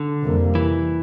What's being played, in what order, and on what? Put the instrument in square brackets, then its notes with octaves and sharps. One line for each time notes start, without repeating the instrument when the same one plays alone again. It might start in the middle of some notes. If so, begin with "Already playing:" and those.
Already playing: [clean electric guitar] D3
[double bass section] F2 C3 G3 A#3
[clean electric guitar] E3